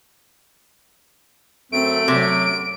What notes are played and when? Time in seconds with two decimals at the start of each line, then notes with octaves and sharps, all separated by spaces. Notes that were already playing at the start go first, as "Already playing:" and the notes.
1.72 F#2 A3 C4 D7
2.08 C3 F#3